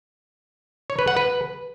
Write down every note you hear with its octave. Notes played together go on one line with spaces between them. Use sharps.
C#5
B4
F#5
B4